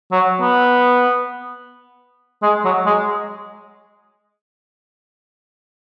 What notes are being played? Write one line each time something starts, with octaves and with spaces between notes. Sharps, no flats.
F#3
B3
G#3
F#3
G#3